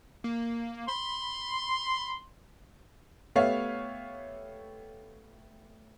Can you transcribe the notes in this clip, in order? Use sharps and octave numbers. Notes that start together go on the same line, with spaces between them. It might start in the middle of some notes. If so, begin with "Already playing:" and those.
A#3
B5 C6
A3 B3 G4 C#5 E5 F5